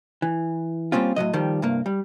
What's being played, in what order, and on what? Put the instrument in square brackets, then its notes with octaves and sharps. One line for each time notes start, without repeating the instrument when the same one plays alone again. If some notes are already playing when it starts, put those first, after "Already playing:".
[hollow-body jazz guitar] E3
G3 A#3 C4 C#4 F4
A2 C3 F#3 D#5
D#3 F3 G3
C2 G2 A#3
G3